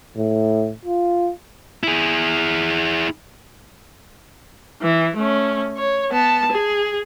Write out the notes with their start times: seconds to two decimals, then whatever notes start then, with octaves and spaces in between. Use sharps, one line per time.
0.16 A2
0.85 F4
1.83 E4 G#4
4.81 E3
5.17 A3 C#4
5.78 C#5
6.11 B3 A5
6.51 G#4